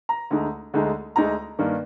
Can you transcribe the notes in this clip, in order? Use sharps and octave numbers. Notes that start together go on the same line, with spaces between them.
A#5
D2 D3 G#3 D#4
D2 D3 G#3 D#4
D2 D3 G#3 D#4 A#5
G2 D#3 A#3